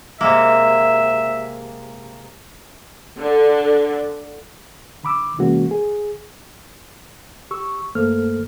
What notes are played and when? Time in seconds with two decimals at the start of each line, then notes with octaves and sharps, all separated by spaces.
0.21 C3 G#3 A#3 E5
3.20 D3
5.03 D3 B5 D6 E6
5.38 C3 E3 G#3 A#3 C#4 F#4
5.71 G#4
7.51 G4 C#6 E6
7.95 G2 A3 A#3 A4 C5 F6